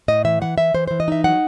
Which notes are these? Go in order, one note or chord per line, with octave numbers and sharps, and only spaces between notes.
A2 D#5
E3 E5
E3 F#5
E3 E5
E3 C5
E3 C5
D#5
D#4 E5
F#3 F#5